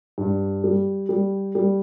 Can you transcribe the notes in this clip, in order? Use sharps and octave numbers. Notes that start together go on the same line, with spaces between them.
G2
G3
G3
G3